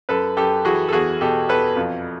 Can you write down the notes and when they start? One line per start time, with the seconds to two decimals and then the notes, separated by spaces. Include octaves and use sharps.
0.09 F#2 A4 B4
0.37 F#2 G4 A4
0.65 E3 F#4 G#4
0.89 A4
0.92 E2 F#4 G#4
1.21 B2 G4 A4
1.49 E2 A4 B4
1.76 F2